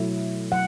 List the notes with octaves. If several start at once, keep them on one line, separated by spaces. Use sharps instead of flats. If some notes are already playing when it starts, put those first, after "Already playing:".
Already playing: B2 F#3 A3 E4
F#3 F#5